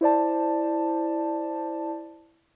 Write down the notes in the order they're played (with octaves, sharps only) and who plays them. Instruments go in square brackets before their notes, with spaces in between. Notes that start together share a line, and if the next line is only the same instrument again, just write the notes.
[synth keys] E4 C5 D5 A5